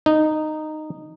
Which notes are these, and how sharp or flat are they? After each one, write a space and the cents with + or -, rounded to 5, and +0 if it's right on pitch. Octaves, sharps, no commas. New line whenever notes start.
D#4 -10